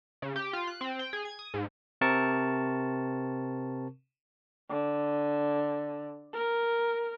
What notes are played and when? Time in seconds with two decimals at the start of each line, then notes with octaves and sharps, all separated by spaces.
0.22 C#3
0.36 G4
0.53 F4
0.67 F#6
0.81 C4
0.99 G5
1.13 G#4
1.25 G#6
1.39 D#6
1.54 G#2
2.01 C3 C4 A#4 A5 C#6
4.70 D3
6.34 A#4